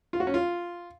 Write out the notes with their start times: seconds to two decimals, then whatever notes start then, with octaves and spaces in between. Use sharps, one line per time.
0.13 F4
0.20 F#4
0.27 C#4
0.34 F4